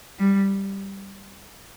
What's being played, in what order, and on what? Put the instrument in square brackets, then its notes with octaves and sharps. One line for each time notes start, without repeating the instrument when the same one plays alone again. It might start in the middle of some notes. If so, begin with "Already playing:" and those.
[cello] G3